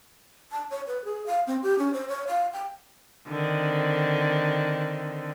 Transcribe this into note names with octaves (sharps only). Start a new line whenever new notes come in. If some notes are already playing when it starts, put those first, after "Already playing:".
A5
C#5
B4
G#4
F5
C4
G4
C#4
C5
C#5
F5
G5
D3 D#3 C4